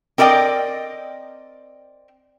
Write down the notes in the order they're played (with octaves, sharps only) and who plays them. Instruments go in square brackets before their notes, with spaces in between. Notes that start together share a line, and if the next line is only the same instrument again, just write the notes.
[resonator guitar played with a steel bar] C4 A#4 D5 D#5 G5